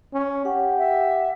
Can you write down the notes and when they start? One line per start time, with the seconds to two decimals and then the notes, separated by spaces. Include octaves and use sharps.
0.13 C#4
0.45 G4 F#5
0.78 E5